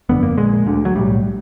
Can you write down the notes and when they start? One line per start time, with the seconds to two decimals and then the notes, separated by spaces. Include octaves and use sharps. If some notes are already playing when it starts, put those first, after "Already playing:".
0.09 G1 F2 D3 B3
0.23 A#3
0.37 A#1 A#2 G#3
0.66 D2 D3
0.85 F#3
0.95 B1 A2 G3